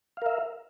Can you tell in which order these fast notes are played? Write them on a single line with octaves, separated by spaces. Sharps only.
F5 A#4 E5